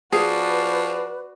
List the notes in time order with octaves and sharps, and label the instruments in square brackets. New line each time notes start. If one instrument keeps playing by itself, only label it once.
[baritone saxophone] F3 [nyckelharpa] F#4 D5 [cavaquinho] G#4 [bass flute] B4